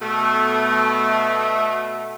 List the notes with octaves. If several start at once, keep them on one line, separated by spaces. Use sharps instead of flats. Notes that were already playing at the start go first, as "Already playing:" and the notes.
B2 A3